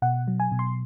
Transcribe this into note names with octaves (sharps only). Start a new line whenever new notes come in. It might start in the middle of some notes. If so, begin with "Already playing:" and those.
B2 F#5
F#3
G#5
B2
C6